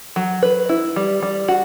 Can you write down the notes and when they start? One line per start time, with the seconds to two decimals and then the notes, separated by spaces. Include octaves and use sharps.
0.16 F#3
0.43 B4
0.69 E4
0.96 G3
1.23 G3
1.48 F#4